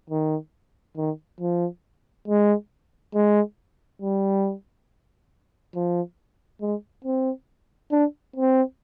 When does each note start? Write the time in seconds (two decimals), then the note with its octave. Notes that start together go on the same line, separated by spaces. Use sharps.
0.10 D#3
0.97 D#3
1.40 F3
2.28 G#3
3.15 G#3
4.02 G3
5.75 F3
6.61 G#3
7.04 C4
7.92 D4
8.36 C4